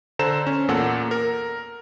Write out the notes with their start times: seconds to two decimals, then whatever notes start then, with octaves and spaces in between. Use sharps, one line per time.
0.19 D3 A4 C5 A#5 E7
0.47 C#4
0.68 E2 A#2 A4 A#4 F#5
1.11 A#4